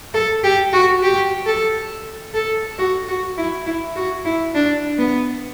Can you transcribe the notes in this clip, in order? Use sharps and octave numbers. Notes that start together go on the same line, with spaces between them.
A4
G4
F#4
G4
A4
A4
F#4
F#4
E4
E4
F#4
E4
D4
B3